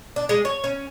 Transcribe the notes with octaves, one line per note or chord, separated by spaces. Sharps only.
D4
G#3
C#5
C#4